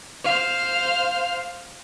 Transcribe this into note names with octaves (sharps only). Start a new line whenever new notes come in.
C5 F5